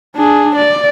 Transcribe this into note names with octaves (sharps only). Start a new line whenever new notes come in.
D4 G#4
D5